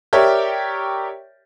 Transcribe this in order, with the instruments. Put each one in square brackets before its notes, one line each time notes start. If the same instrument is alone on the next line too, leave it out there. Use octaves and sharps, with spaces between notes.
[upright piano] G4 A#4 C#5 D5 E5 G5